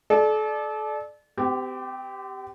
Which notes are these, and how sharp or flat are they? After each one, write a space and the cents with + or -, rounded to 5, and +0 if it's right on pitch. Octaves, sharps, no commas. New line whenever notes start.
A4 -35 D5 +15
C4 -40 G4 +0